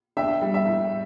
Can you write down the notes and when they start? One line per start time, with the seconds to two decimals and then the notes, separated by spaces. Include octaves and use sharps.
0.17 D4 E5 G5
0.42 G3
0.54 E5
0.66 A2